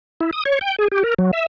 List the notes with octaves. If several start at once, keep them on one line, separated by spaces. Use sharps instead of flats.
E4
D#6
C#5
G5
G#4
G4
A#4
F#3
E5